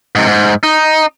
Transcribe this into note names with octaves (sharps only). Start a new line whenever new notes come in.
G#2 C3
G#2
D#4